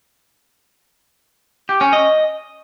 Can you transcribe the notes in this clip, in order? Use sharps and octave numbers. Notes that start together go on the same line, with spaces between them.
G4
C#4
D#5